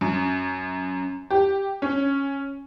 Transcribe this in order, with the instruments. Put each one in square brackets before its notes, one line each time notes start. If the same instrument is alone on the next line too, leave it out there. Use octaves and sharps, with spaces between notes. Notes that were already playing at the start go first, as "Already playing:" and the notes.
[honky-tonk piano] F#2
G4
C#4